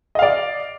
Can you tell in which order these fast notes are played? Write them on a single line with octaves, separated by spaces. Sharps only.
D#5 F5 D5